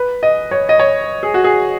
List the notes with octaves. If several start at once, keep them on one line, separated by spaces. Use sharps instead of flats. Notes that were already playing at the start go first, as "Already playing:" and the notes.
Already playing: B4
D#5
C#5
D#5
C#5
G#4
F#4
G#4